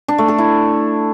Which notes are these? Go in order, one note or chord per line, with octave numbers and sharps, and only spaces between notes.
D4
A3
A4
E4